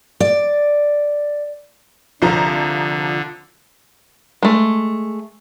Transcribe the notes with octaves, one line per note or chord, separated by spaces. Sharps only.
D5
C2 D3 F3 A#5
G#3 A3